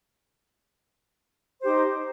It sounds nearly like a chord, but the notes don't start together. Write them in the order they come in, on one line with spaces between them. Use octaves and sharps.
C5 G4 D#4